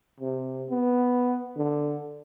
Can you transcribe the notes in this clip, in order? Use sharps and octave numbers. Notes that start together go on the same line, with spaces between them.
C3
B3
D3